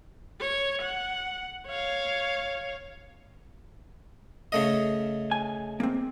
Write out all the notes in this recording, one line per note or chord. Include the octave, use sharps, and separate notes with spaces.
C#5
F#5
C#5 F5
C#3 A3 D#5
G#5
A#3 C4